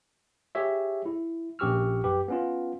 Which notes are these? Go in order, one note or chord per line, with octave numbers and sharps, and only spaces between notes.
G4 G#4 C#5 E5
E4
A#1 C#4 G4 C#6 E6 F6
F#2 G4 B4
B3 C#4 F4